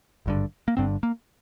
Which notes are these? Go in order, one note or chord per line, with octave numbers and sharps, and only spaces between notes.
G#1 G2 D3
A#3
G1 G2 D3 C4
A#3